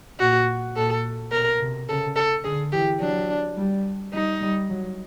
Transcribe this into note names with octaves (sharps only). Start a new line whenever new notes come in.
A#2 F#4
A#2 A4
B2 A#4
C3
C#3 A4
A4
D3 G#4
E3 G4
F#3 D4
G3
G3 D#4
G3
F#3